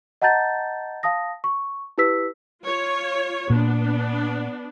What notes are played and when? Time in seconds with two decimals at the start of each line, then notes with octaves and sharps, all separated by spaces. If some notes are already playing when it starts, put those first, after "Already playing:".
0.22 D#5 F#5 A5 A#5 G6 A6
1.03 F5 A5 D#6 A#6
1.44 C#6
1.98 E4 G4 B4 E6 B6
2.64 F4 C#5
3.50 A#2 B3 D4